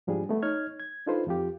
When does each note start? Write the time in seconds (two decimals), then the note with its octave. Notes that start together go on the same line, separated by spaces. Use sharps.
0.07 G#2 F3 G3 D4 G#4
0.29 A3 B3
0.43 D#4 C#5 F6 G#6
0.80 G#6
1.07 D4 D#4 F4 A4 B4 C5
1.27 F2 F3 F4 G4